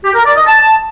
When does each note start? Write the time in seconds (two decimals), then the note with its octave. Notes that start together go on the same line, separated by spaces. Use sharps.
0.04 G4
0.15 A#4
0.25 D5
0.36 D#5
0.46 A5